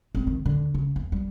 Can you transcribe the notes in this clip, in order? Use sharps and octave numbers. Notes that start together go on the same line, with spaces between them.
G3 C4
D#3
D#2 D3
C#3
E2
G3